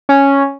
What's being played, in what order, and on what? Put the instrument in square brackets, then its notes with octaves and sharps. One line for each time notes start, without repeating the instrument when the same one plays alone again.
[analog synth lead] C#4